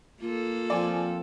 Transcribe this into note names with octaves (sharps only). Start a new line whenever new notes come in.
A#3 F4 A4
F3 C4 D5 G#5